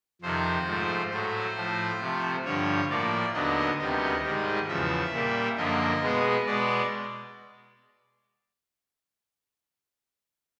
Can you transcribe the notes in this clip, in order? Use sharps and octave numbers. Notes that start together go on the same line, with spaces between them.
F2 C3 D#3 C5
G#2 F3 A3
A2 F#3 A3 C5
A2 F3 A3
C3 F3 A3
G2 D3 F3 C#5
A2 F3 A#3 D5
D#2 D3 F#3 B3 D#5
D2 C3 D#3 G3 B3 D#5
G#2 D#3 G3
E2 C#3 F3 E5
A#2 G3 A#3
F#2 D3 F3 A#3 D#5
B2 G#3 B3
B2 G#3 B3 D5